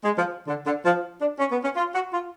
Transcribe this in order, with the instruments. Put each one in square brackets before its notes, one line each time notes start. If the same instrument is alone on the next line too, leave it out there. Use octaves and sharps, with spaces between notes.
[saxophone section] G#3
F3
D3
D3
F3
D4
C#4
B3
C#4
F4
F#4
F4